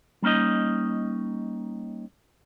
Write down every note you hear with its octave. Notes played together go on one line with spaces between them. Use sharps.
G3 A#3 C#4 D#4 D#5